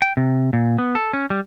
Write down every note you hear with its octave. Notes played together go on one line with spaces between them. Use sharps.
G5
C3
A#2
B3
A4
C#4
G3